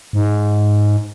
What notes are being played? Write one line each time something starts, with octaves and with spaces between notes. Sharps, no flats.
G#2